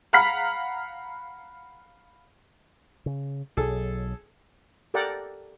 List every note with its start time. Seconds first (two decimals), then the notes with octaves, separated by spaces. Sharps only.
0.13 F5 F#5 A#5 B5 F6 B6
3.06 C#3
3.57 B1 F#3 G#4 A4
4.94 G4 A4 A#4 D5 F#5 G5